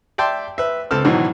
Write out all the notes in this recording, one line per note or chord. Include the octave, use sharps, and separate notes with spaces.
D5 E5 G5 A5 C6
B4 E5
C#2 C4 A4 A5 F6
G#2 B2 D#3 E3 F#3